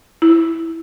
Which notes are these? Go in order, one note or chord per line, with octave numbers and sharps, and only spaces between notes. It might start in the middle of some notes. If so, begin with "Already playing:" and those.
E4